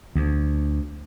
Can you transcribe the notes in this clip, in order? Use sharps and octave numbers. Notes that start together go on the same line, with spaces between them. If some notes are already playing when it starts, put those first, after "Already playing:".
D2